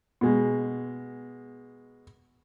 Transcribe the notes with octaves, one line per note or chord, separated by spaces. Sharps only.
B2 G#3